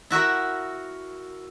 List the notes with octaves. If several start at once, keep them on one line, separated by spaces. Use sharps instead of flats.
E4 F#4 A#4 E5